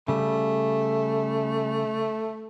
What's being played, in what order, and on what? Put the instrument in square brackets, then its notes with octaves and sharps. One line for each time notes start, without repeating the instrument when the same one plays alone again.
[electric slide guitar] C#3 G3 [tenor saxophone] A3